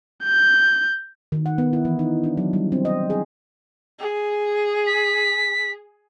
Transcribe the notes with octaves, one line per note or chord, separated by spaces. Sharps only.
G6
D#3
F#5
B3
E4
E3
D#4
D4
F#3
G3
C4
D#5
G#4
G#4
B6